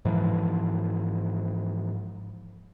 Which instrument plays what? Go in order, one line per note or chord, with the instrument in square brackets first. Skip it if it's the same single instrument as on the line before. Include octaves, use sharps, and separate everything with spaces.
[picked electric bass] G#2 E3 F3